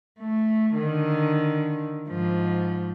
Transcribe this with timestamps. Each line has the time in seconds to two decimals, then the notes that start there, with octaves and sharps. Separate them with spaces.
0.20 A3
0.75 D3 D#3
2.08 G#2 F3